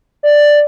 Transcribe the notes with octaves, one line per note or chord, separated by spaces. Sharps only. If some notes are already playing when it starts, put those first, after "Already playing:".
D5